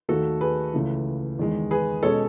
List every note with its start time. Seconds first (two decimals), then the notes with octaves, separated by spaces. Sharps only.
0.09 D#2 D#3 A3 F#4 A4
0.41 G#4 B4
0.73 C#2 C#3 E3 A3
1.39 E2 D#3 G#3
1.71 G#4 B4
2.03 B2 G#3 C#4 A4 C#5